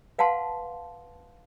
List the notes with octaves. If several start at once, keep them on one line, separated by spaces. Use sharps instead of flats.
B4 F5 F#5 A5 C6